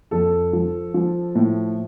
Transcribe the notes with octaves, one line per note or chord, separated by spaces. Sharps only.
F2 A4
F3
F3
A2